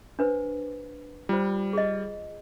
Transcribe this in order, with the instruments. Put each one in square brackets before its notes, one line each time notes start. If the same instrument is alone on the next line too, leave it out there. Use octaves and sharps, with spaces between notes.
[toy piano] D4 B4 C5
[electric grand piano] G3 [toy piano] F4 C5
[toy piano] G#4 D#5